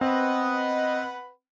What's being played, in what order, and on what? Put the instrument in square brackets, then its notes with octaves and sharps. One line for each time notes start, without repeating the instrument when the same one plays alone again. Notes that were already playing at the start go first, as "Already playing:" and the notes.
[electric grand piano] C4 [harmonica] B4 F#5 B5 [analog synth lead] D#5